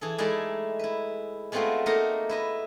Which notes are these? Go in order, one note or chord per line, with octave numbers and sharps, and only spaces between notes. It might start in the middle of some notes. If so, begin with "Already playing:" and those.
E3 G#4 A4
G#3 A3 D#4 E4 G#4 D5
E4 B4
G#3 A3 B3 C4 F4 F#4
A3 A#3 D#4 A#4 F#5 A#5
E4 B4 D#5